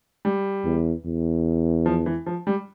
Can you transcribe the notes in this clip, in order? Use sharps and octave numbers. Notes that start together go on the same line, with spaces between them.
G3
E2
E2
F3
E3
F3
G3